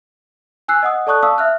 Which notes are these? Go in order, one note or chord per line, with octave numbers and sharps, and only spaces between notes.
G#5 E6 F#6 C7
D#5 F#5 D#6
A4 D5 A5 C#6 D#6 F#6
F5 A5 C#6 D#6 E6
E5 F6 F#6